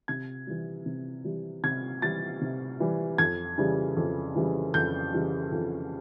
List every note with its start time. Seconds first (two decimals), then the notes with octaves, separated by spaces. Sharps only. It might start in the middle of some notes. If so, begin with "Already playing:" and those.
0.08 C3 G#6
0.47 E3 G3
0.86 C3
1.24 E3 G3
1.63 C3 G#6
2.02 E3 G3 A6
2.41 C3
2.80 E3 G3
3.18 F2 G#6
3.58 C#3 E3 G3
3.96 F2
4.36 C#3 E3 G3
4.74 F2 G6
5.13 C#3 E3 G3
5.52 F2